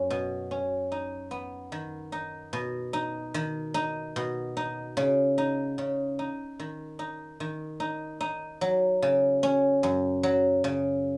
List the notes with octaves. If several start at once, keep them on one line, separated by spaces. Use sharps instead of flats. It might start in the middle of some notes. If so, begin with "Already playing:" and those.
Already playing: F#2 C#4
B2
C#4
D#4
B3
D#3
D#4
B2
D#4
D#3
D#4
B2
D#4
C#3
D#4
C#3
D#4
D#3
D#4
D#3
D#4
D#4
F#3
C#3
C#4
F#2
F#3
C#3